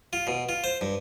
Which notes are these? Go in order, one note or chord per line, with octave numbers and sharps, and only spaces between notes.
F4
B2
F4
C5
G2